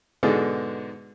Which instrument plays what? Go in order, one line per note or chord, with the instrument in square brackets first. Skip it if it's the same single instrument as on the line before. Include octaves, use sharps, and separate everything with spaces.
[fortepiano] G#2 B2 D3 G#3